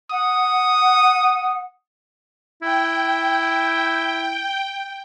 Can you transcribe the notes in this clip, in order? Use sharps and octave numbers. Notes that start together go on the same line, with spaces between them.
F#5 D#6
E4 G5